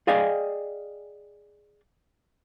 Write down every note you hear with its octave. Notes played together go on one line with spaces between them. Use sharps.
G#4 D5 D#5 F5 G5 G#5